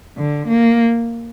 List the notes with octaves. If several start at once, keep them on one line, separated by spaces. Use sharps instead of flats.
D3
A#3